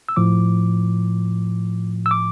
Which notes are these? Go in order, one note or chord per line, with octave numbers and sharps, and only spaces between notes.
E6
A2 F3 D6
E6
D6